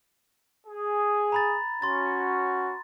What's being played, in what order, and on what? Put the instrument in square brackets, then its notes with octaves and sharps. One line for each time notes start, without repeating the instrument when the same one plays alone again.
[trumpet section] G#4
[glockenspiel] A#5 B5 A6
[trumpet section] C#4 F#4 [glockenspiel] C6 A6